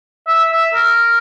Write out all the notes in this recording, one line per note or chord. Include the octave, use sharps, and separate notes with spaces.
E5
E5
A#4